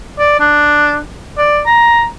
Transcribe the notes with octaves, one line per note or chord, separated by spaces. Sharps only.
D5
D4
D5
A#5